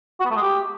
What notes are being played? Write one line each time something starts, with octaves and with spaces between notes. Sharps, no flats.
F#4
B3
A3
G#3
G4